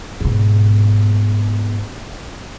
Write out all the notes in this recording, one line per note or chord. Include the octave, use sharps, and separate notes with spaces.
G#2 B2